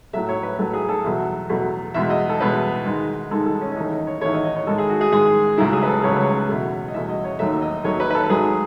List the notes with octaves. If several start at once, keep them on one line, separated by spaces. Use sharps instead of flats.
A2 F#3 A3 E5
C#5
B4
A2 F#3 A3 A4
G#4
A4
E2 B2 F#3 A3
E2 B2 F#3 A3
E2 B2 G#3 E5
D#5
A4
E2 B2 G#3 B4
G#2 D#3 G#3
G#2 D#3 G#3 A4
A4
C#4
C#4
E2 D#3 A3 D#4
D#4
C#5
E2 D#3 A3 C#5
D#5
D#5
C#5
G#2 D#3 G#3 A4
G#4
F#4
G#4
G#2 D#3 G#3 G#4
C#2 C#3 F#3 A3 E4
G#4
B4
A4
C#2 C#3 F#3 A3 C#5
B4
C#5
E2 B2 A3
D#5
E2 B2 A3 E5
D#5
C#5
D#2 D#3 F#3 A3 E5
D#5
D#2 D#3 F#3 A3 C#5
B4
B4
A4
G#2 F#3 A3 G#4